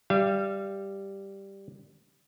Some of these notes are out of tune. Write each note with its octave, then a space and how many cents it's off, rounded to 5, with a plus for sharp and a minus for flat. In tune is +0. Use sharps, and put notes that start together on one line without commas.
G3 +0 F5 -40